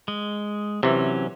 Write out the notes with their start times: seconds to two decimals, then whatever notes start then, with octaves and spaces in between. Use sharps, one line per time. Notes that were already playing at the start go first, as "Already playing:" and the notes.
0.08 G#3
0.83 C3 E3 F#3 C#4